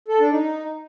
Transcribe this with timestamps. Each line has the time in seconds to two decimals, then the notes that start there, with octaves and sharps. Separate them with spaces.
0.08 A4
0.20 D4
0.31 D#4